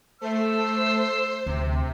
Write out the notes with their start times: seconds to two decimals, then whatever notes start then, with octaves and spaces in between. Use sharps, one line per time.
0.21 A3 C5 E6
1.46 D2 C3